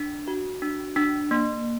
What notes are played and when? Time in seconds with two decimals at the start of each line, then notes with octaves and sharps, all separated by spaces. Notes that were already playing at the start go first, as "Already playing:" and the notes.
Already playing: D4
0.28 F#4
0.62 D4
0.96 D4
1.31 A#3